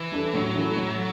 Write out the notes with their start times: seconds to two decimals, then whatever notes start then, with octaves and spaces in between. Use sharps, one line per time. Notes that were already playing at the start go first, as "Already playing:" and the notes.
Already playing: E3
0.12 G3 D4 A4
0.33 A2 F#3
0.55 E3 A3 E4 A4
0.76 A2